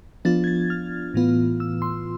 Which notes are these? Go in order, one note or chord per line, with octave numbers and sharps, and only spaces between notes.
F3 B3 D4 F4 A6
G#6
A6
F6
A2 E3 B3 F4
E6
C6